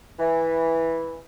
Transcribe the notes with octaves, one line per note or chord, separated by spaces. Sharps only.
E3